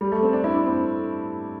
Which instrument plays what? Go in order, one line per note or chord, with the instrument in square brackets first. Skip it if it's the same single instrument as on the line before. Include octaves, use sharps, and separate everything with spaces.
[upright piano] G3
A3
C4
D4
E4
D4
C4